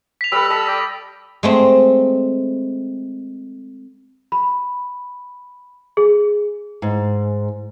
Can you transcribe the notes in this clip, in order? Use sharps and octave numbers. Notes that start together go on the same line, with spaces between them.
B6 F7
G3 A4 B4 B5 E6
A4 D#5 A5 B5
D5 G5
G#3 A3 C4
B5
G#4
G#2